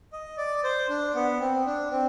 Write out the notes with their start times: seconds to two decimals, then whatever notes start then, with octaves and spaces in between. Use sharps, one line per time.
0.13 D#5
0.38 D5
0.64 C5
0.89 D4
1.15 B3
1.40 C4
1.66 D4
1.91 C4